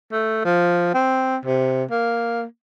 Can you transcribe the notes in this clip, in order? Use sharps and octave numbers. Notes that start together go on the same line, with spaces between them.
A3
F3
C4
C3
A#3